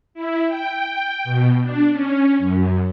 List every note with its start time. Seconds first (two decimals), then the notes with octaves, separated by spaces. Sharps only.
0.14 E4
0.47 G5
1.24 B2
1.62 D4
1.92 C#4
2.38 F#2